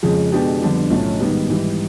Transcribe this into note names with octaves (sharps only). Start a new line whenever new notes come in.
F2 C#3 F3 G#3
B2 G#3 B3 D4 G4
F2 D3 G3 B3 D4
B1 A2 F3 A3 C#4
G#2 D#3 G3 B3
G#2 E3 G3